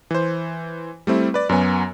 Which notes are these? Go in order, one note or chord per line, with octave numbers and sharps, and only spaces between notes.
E3 C5
G3 A3 C4 E4
B4 D5
F#2 F#3 B3 G#5